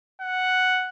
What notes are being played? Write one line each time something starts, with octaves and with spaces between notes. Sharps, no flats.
F#5